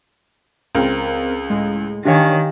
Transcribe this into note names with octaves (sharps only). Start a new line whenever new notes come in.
C#2 C4 A#4
A2 G#3
D#3 D4 G4 C#5 F5 G#5